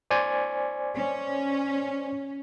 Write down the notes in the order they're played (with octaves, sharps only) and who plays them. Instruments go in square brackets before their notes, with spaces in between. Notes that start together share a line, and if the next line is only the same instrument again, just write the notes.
[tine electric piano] C5 D5 G#5
[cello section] C#4